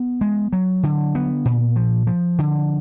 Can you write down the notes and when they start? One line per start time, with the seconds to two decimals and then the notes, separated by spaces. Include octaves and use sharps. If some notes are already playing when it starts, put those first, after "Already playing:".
Already playing: B3
0.21 G#3
0.53 F#3
0.83 D3
1.15 B3
1.45 A#2
1.76 F3
2.07 F3
2.38 D3